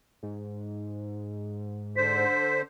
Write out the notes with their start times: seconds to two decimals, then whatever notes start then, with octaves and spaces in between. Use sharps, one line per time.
0.23 G#2
1.96 D3 C5 B6